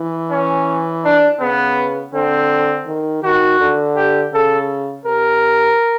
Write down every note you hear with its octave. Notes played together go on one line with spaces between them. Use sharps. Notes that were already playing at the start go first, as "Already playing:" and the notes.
Already playing: E3
C#4
D4
C#3 B3
D3 C4
D#3
D#3 F#4
D3
G4
C#3 A4
C3 A#4